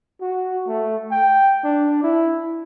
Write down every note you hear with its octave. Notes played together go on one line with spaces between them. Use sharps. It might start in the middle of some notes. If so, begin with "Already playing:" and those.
F#4
A3
G5
D4
E4